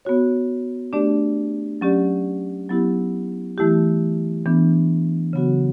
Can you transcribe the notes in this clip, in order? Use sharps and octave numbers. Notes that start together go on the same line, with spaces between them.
B3 F#4 C#5
A3 D4 G4 D5
F#3 C#4 G4 D5
F#3 B3 E4 G4
E3 A3 E4 G4
E3 B3 D4
C#3 F#3 B3 F#4